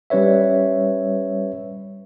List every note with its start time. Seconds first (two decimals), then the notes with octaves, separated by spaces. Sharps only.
0.10 G3 C#4 B4 C#5 E5